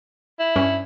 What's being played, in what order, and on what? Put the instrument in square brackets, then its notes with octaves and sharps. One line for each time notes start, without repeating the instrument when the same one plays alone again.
[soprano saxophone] E4
[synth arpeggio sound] G2 C#4